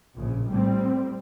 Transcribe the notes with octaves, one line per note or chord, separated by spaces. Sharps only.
A#1 C#3
A2 G3 C4